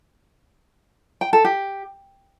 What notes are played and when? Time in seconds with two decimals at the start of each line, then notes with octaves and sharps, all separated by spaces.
1.21 G5
1.33 A4
1.45 G4